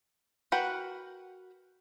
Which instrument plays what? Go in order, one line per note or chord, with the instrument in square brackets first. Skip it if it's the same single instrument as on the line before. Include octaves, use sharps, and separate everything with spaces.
[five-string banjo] F#4 A#4 B4 F#5 G5